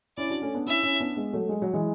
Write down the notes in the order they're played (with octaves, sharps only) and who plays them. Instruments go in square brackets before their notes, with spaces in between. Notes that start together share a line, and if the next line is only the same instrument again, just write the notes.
[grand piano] C#4 E4 [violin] D5
[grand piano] D4 F#4
A3 C#4
B3 D4
[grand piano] C#4 E4 [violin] E5
[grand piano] C#4 E4
B3 D4
G#3 B3
F#3 A3
G#3
F#3
E3 G#3